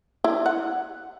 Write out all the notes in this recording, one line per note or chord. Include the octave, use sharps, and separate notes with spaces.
E4
F#5